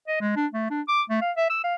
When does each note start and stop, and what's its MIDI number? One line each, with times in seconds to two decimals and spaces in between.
0.07 0.19 75
0.20 0.31 56
0.36 0.46 62
0.53 0.66 57
0.70 0.81 62
0.88 1.02 86
1.09 1.21 57
1.21 1.31 77
1.37 1.49 76
1.50 1.61 88
1.64 1.75 77